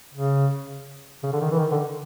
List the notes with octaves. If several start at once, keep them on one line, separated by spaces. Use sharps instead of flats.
C#3
C#3
D3
D#3
E3
D#3
D3